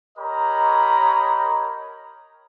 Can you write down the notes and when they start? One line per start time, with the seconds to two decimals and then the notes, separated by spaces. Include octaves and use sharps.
0.18 G4 A#4 C#5 D#5 A#5 B5